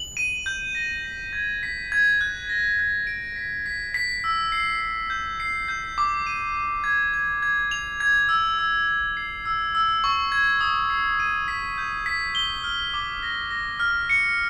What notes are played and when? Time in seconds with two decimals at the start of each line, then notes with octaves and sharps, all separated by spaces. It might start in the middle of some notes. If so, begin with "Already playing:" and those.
Already playing: F#7
0.17 D#7
0.46 G6
0.75 A#6
1.05 B6
1.33 G#6
1.63 B6
1.92 G#6
2.21 F#6
2.49 A#6
2.79 F#6
3.07 D7
3.36 B6
3.66 B6
3.94 B6
4.24 E6
4.52 C7
4.81 C7
5.10 G6
5.40 C7
5.68 G6
5.98 D6
6.27 D#7
6.55 D#7
6.84 G#6
7.13 G#6
7.42 G#6
7.71 F7
8.00 G#6
8.29 E6
8.59 E6
8.87 E6
9.17 C7
9.45 E6
9.75 E6
10.04 C#6
10.32 G#6
10.61 D#6
10.90 C7
11.20 D#7
11.48 B6
11.78 G6
12.06 B6
12.35 G7
12.64 F6
12.94 D6
13.23 A#6
13.51 A#6
13.80 F6
14.10 C#7